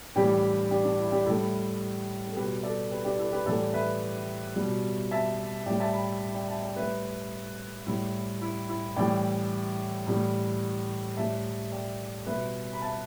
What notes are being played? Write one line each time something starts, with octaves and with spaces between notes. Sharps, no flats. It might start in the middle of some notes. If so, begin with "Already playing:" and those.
A2 E3 G3 D4 G4
D4 G4
D4
E4
D4 G4
A2 G3 E4 A4
A4
B2 G3 G4 B4
A4 D5
G4 B4
D4 G4
E4 A4
G4 B4
A2 E3 G3 A4 D5
B4 E5
B2 G3
E5 A5
A2 G3 D5 G5
E5 A5
G5 B5
D5 G5
E5 A5
D5 G5
A2 G3 B4 E5
A2 G3 E4
E4
E4
A2 E3 G3 D5 G5
A2 E3 G3
A2 G3 E5 A5
D5 G5
B2 G3 B4 E5
B5
E5 A5